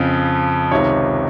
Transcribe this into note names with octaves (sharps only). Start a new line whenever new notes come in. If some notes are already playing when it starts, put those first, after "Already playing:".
Already playing: F2 C#3 F3
C#2 C3 D#3 C#5